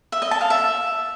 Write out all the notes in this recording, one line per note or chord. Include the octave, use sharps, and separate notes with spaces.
E5
D#5
A5
F5
E5